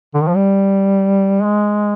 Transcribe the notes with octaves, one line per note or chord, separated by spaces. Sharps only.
D3
D#3
F3
G3
G#3